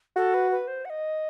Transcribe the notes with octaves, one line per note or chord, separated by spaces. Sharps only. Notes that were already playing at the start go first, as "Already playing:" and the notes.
F#4 A4
B4
B4
C5
F#5
D#5